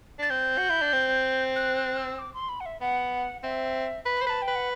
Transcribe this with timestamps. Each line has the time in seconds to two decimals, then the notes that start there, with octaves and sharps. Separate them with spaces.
0.19 D4 A6
0.30 C4 G6
0.58 F#4
0.69 E4
0.82 D4
0.93 C4
1.56 F#6
1.77 F#6
1.98 E6
2.19 D6
2.34 C6
2.49 B5
2.60 F#5
2.66 E5
2.81 B3 F#5
3.43 C4 E5
4.06 B4
4.16 C5 B5
4.27 B4 A5
4.42 G5
4.48 B4
4.55 F#5